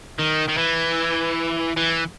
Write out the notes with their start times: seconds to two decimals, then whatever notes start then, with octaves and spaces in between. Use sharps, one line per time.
0.19 D#3
0.49 D#3
0.58 E3
1.77 E3